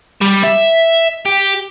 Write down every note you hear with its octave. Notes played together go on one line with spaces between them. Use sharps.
G3
E5
G4